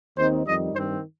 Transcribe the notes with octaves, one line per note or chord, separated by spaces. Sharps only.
D#2 D#3 C4 D#4 C5
F2 D#3 G3 D#4 D#5
G2 D#3 C4 C5